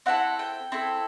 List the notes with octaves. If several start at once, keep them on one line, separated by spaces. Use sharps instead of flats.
C4 E4 A4 F#5
G5
C4 E4 A4